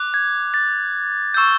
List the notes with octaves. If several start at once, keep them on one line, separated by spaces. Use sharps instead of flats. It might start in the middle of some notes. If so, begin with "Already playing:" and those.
Already playing: D6 F#6
G#6
A6
C#6 E6 G6